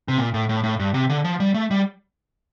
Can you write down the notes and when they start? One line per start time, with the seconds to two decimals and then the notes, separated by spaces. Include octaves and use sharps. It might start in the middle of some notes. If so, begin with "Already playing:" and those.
0.08 C3
0.18 A#2
0.34 A2
0.49 A2
0.64 A2
0.80 G2
0.94 C3
1.09 D3
1.24 F3
1.40 G3
1.54 A3
1.71 G3